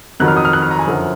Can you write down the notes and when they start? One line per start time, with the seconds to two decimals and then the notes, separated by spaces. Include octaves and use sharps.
0.20 F2 D#3 F#3 F#6
0.28 F6
0.37 D#6
0.45 F6
0.53 F#6
0.62 F6
0.71 A#5
0.79 G#5
0.87 F#2 D3 F3